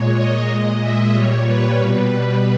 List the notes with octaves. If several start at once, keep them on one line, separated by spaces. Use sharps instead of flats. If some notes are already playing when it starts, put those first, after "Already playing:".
Already playing: A#2 G#3 C#5
D#5
A#2 G#3
E5
A#2 G3 C#5
B4
B2 G3 B4